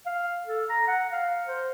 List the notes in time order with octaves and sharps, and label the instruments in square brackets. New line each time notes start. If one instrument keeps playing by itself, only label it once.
[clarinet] F5
A4
A#5
F#5
F5
C5